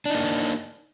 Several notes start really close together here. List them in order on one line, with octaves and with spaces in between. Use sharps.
D4 D#4 A#3